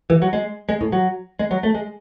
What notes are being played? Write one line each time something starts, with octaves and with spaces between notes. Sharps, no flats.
E3
F#3
G#3
G#3
A2
F#3
G#3
F#3
A3
G#3